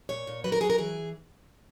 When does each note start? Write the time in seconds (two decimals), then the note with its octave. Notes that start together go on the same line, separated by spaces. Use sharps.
0.09 A#2 C#5
0.27 A#2
0.44 F#3 B4
0.52 A#4
0.60 F#3 G#4
0.70 A#4
0.78 E3 G#4